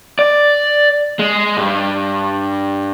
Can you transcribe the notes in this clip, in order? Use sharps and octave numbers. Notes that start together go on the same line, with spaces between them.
D5
G#3
G2